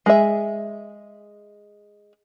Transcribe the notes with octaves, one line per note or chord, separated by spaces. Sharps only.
G#3 G#4 E5